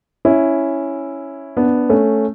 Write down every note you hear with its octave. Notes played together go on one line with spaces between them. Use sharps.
C#4 E4
B3 D4
A3 C#4